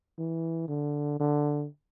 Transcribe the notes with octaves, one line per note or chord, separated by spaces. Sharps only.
E3
D3
D3